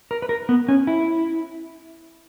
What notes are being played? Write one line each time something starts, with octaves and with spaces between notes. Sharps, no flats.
A#4
B4
A#4
B3
C#4
E4